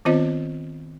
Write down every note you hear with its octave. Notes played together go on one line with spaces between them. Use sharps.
D#3 B3 C4 F4 C5 D#5